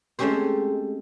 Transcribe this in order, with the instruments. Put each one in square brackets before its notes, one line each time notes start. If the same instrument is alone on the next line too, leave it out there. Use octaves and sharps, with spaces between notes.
[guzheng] G#3 A3 C4 C#4 G4 C5